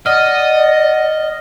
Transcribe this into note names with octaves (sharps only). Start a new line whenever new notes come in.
D5 D#5 F#5 F6